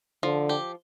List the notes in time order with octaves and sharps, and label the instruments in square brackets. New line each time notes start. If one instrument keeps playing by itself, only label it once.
[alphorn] D3 [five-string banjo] F3
[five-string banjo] G4